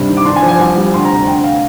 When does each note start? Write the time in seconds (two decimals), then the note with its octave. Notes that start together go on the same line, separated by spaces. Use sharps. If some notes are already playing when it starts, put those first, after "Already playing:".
Already playing: G2 C3
0.08 D#3
0.17 D6
0.25 D4 C6
0.36 G#5
0.42 F3
0.49 G#5
0.59 C2
0.76 G3
0.94 D2 C6
1.05 A#5
1.10 C3
1.27 D2 G5
1.44 F5